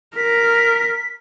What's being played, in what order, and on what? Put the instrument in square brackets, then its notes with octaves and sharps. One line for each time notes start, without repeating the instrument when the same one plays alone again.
[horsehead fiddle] A#4 [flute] B6